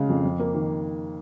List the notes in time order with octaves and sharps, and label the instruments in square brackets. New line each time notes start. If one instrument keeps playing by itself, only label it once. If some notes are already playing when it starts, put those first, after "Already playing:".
Already playing: [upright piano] C#3 G#3 F5
F2
F2
A#3
D#3